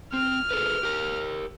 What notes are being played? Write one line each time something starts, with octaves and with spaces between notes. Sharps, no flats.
C4 F6
G#4 A4 B4
G4 A#4